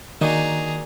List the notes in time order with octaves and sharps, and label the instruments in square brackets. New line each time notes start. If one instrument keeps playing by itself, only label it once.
[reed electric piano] D#3 [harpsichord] A#3 D4 F#4 [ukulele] D#4 [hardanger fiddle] G#4 A#5